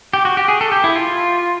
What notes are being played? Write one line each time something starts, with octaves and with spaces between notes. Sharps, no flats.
G4
F#4
G4
G#4
A4
G4
E4
F4